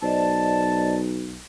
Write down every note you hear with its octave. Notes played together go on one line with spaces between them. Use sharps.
B1 C5 D5 D#5 A5